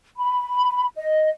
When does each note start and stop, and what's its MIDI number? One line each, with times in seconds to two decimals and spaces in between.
0.17 0.87 83
0.95 1.30 75